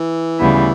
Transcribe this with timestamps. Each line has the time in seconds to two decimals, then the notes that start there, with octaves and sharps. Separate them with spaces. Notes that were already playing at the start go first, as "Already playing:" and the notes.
Already playing: E3
0.39 D2 C#3 G3 B3 E4